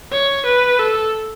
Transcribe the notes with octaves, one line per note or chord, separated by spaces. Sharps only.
C#5
B4
A4